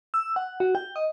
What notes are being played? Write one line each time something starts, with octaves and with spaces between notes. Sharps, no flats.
E6
F#5
F#4
G5
D#5